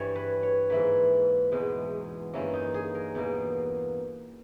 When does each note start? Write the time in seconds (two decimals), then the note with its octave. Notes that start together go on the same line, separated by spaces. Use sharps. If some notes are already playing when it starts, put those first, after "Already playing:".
Already playing: G2 E3 G3 C#5
0.15 B4
0.43 C#5
0.70 G#2 E3 A#3 B4
1.52 E2 B2 G#3
2.33 G2 E3 A#3 C#4
2.53 D#4
2.74 G#4
2.95 A#4
3.15 E2 B2 A#3